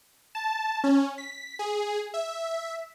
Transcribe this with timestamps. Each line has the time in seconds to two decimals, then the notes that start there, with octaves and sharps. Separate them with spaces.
0.35 A5
0.84 C#4
1.18 B6
1.59 G#4
2.14 E5